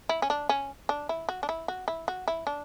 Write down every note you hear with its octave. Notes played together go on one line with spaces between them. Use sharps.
E4
C#4
D4
C#4
D4
E4
F#4
D4
E4
F#4
E4
F#4
E4
D4